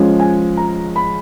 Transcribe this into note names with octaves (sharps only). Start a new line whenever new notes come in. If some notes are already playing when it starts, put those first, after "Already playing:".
Already playing: F3 G#3 C#4
G#5
A#5
B5